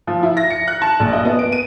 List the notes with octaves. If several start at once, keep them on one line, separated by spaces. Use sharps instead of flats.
F3
E4
A#6
C#7
F#6
A5
A#1
D#5
B3
D7
D#7